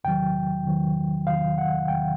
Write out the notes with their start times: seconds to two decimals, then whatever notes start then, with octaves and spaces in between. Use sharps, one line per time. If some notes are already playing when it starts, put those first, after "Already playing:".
0.04 E2 C3 D#3 F#3 G5
0.65 E2 C3 D#3 F#3
1.27 E2 C3 D#3 F#3 F5
1.58 F#5
1.88 E2 C3 D#3 F#3 G5